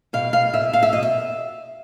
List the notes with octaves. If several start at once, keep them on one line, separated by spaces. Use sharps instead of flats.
B2 F5
B2 F5
B2 E5
B2 F5
E5
B2 D#5
E5